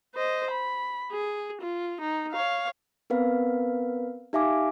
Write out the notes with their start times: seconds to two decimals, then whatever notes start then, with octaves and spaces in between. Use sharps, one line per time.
0.15 C5 D#5
0.51 B5
1.12 G#4
1.61 F4
2.01 D#4
2.33 C#5 F5
3.10 B3 C4 A#4 B4 F5
4.33 D#4 G4 E5 F5 G#5 D6